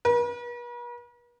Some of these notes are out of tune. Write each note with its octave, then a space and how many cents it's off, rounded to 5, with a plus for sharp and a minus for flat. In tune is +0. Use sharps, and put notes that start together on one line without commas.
B4 -45